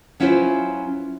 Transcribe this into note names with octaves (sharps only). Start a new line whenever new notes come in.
F#3 C#4 E4 F4 B4 C5